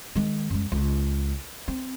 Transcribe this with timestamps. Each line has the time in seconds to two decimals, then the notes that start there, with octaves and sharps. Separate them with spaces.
0.15 D#3 G#3
0.50 F#2 G#3
0.72 C#2
1.68 C4